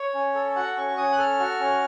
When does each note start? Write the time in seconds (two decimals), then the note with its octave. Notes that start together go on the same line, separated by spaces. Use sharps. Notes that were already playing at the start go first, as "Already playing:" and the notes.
Already playing: C#5
0.15 C#4
0.35 A4
0.56 F#4 F#5
0.76 C#4 C#6
0.97 C#4 D#6
1.12 F#6
1.18 A4 F6
1.39 F#4
1.60 C#4